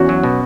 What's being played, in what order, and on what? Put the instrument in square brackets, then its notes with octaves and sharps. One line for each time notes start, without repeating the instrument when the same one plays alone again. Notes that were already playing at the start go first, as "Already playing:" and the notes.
Already playing: [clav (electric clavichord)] E2 [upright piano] C#4 F#4
[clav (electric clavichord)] F#3
B2